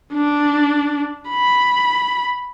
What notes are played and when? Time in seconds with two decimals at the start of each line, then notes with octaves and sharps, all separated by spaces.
0.14 D4
1.29 B5